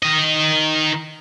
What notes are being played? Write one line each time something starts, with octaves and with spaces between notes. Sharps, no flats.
D#3 D#5